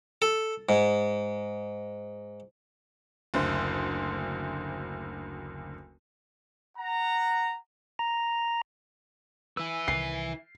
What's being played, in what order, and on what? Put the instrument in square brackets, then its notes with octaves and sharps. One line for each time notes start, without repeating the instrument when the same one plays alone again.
[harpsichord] A4
G#2
[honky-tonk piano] F#1 D2 C5
[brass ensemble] F#5 A#5
[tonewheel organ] A#5
[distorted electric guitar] E4 B4 [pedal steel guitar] G#5 E6
[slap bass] C2 D#3 [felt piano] C7